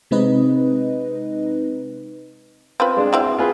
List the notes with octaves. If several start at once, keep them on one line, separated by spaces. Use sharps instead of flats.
C3 G#3 C4 D#4 B4 D#5
C4 F4 B4
G#3 D4
C4 E4 F#4
C6
F4 G#4 B4